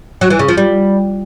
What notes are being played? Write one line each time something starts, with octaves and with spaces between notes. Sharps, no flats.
F#3
E3
C#3
F3
G3